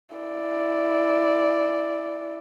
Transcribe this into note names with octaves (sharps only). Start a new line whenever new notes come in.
E4 D5